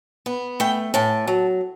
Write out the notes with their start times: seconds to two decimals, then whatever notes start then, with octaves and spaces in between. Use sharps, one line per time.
0.26 B3
0.60 A3 G5
0.94 A2 A5
1.28 F#3